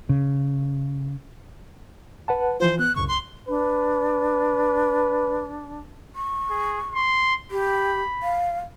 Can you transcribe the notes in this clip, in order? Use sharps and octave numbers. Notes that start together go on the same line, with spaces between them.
C#3
B4 F#5 A5
E3 F3 F4 C5
B3 F#6
C2 F#2 C#3 C#6
C6
D4 B4
C#6
G#4
C6
G4 B5
F5